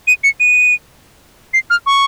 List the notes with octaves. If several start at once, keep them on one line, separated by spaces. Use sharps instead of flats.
D#7
C#7
D#7
C7
F6
C#6